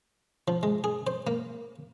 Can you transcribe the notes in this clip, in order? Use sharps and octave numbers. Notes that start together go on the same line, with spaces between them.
F3
G#3
G#4
C5
A#3